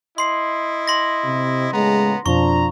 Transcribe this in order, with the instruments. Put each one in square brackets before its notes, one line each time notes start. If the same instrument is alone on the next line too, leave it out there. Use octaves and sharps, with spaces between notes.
[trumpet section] E4 D#5 [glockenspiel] C6 C7
[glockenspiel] C6 A#6
[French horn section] C3
[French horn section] A2 C#3 G#3 [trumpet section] B3 A#5
[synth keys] F2 B2 [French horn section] F3 D4 [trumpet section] A#5 [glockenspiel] C#6